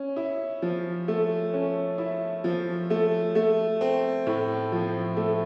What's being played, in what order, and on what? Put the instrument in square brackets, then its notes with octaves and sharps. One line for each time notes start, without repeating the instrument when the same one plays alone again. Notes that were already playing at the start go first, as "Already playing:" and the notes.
Already playing: [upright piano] C#4
E4
F3
A3
C#4
E4
F3
A3
A3
C4
A2
F3
A3